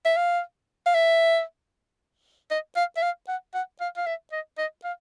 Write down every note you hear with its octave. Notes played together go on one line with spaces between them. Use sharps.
E5
F5
F5
E5
D#5
F5
E5
F5
F#5
F#5
F5
F5
E5
D#5
D#5
F5